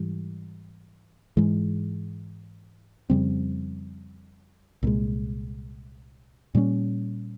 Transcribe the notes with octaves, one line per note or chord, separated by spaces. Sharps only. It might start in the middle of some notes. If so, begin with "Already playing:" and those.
Already playing: G#2 E3 G3
G#2 E3 G#3
F2 C#3 G3 C4
C2 A#2 G#3
A#2 G3 A#3 C#4